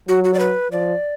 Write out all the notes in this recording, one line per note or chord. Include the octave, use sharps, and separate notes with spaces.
F#3 F#4
F#4
D5
B4
F3 D5